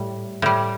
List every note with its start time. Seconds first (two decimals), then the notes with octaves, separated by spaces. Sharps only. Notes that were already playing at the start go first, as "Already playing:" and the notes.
Already playing: A2 G3
0.42 A2 G3